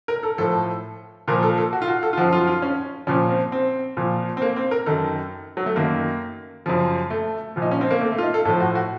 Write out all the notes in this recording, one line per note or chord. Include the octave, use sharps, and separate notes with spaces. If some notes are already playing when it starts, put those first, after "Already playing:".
A#4
A4
A2 F3 A4
A#2 F3 A#4
A4
A4
F#4
F4
F#4
A4
F4
F#2 F3 F#4
F4
F4
C#4
A#2 F3 C#4
C4
C4
A#2 F3
C4
A#3
C4
A#4
F#2 D#3 A4
F#3
A3
F#2 D#3 A#3
F#2 C#3 F3
A3
A#2 F3
D#4
C#4
C4
A#3
A3
A3
F4
D#4
A4
A2 F3 A4
F#4
F#4